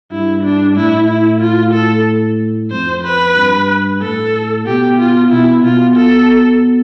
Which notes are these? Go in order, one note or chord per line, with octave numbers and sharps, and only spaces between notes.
G2 E4
D4
A2 E4
E4
F4
A4
F2 C5
B4
G2
A2 A4
B2 G4
F4
B2 E4
B2 F4
A4